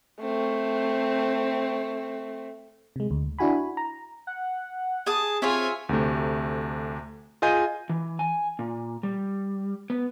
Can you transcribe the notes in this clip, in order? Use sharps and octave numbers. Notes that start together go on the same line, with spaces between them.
A3 C4
C3 G#3
D2
D4 E4 F#4 G#5 B5
A#5
F#5
G#4 A5 D#6
C4 F4 G#4 C#5 E5 G#5
D2 C3 A3
F4 G#4 D#5 G#5 G6 D#7
E3
G#5
A#2
G3
B3